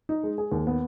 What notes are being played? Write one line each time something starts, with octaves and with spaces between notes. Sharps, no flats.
D#4
G#3
G#4
D#2
B3